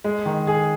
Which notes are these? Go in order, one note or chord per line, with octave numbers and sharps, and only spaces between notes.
G#3
D#3
G#4